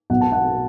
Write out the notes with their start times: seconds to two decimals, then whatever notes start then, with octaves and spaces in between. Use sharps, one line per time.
0.10 B1 B2 F#3 F#5
0.21 A5
0.32 F#5